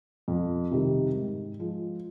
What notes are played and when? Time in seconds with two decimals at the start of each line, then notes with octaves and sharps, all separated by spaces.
0.28 F2
0.71 C3 D#3 G3
1.15 G#2
1.59 F3 G#3